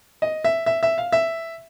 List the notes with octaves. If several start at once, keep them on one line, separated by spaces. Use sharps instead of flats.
D#5
E5
E5
E5
F5
E5